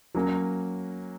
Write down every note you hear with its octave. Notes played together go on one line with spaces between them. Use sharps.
F#3 A#3 C#4